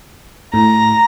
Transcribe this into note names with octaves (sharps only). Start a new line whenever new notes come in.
A2 A#5